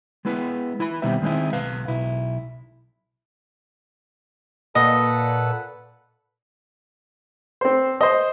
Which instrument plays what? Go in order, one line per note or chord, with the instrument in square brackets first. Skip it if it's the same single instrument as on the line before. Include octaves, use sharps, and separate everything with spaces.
[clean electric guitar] G#3 B3 E4 B4
E4 B4 B5
B1 B2 D#3 G3 C4 E5
D#3 G#3 C4 D#4 E4
B1 B4 F5
B1 E4
[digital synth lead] A#2 [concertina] A4 B4 F#5 [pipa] D#5
[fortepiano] C4 C5
C5 D#5